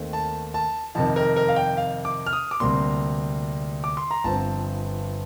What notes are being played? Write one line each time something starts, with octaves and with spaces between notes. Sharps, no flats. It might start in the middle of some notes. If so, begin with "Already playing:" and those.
Already playing: D#2 D#3 A3 C4
A5
A5
F2 C3 D#3 A5
A#4
A#4
F5
G5
F5
D6
F6
D#6
D6
D2 C3 G3 A#3 C6
D6
C6
A#5
G1 G2 F3 C4 A5